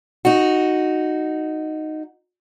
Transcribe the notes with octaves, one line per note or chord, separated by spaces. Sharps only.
D#4 F#4